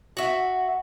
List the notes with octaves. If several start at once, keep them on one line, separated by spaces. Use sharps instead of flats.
F#4 E5